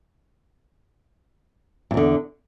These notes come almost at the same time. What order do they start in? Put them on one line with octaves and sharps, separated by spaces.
G2 E2 D3